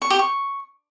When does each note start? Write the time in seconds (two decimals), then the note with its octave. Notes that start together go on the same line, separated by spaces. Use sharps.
0.02 C#6
0.10 G4
0.19 C#6